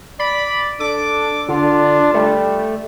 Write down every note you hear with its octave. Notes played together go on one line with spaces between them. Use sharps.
D5 B5
D4 A4 D6
D3 D4 F4
G3 A3